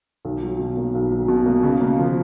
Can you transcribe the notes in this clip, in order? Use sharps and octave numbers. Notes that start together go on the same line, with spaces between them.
B1
F#3
B2
A#3
B1
F#3
B2
A#3
C#3
A#3
F3